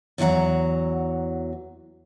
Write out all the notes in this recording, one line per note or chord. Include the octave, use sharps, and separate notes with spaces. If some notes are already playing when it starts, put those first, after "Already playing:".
E2 E3 F#3 F#5 A#5